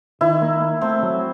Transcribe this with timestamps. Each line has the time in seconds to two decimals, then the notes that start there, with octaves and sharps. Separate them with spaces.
0.21 D#3 E4
0.42 A#3
0.62 A#3
0.81 A3 C4
1.03 F#3